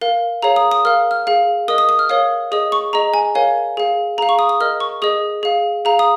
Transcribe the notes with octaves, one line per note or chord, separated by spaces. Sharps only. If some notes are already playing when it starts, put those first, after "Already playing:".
A#4 F5
G#4 C#5 F5 A#5
D#6
D#6
A#4 F5 F6
F6
G#4 F5
A#4 D#5 D#6
D#6
D#6
F6
A#4 C#5 F5 D#6
G#4 D#5 D#6
C#6
G#4 D#5 A#5
G#5
A#4 C#5 F5 G#5
G#4 F5
G#4 F5 A#5
C#6
D#6
D#6
A#4 D#5 F6
C#6
G#4 D#5 D#6
G#4 F5
G#4 F5 A#5
D#6